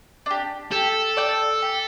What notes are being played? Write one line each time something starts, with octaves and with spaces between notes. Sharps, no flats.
D4 G4
G4 A4
D5 G5
G4